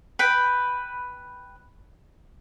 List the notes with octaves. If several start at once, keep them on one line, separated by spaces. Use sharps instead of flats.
B4 G5